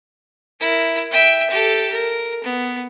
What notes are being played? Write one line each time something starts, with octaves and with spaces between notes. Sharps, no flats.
E4 A#4
E5 G5
G4 A4
A#4
B3